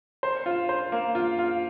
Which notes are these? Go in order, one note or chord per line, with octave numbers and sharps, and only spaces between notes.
C5
F4
C5
A#3
F4
F4